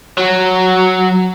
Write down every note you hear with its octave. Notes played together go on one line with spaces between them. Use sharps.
F#3